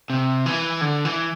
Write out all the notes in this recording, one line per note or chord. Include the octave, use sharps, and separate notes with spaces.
C3
E3
D3
E3